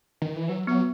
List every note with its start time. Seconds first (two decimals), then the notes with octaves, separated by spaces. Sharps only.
0.22 D#3
0.36 E3
0.48 F#3 B4
0.67 F#3 B3